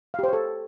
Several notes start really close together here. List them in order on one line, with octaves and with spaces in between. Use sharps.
F5 G4 C5 C#5 A4